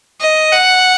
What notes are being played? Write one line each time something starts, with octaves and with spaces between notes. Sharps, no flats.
D#5
F#5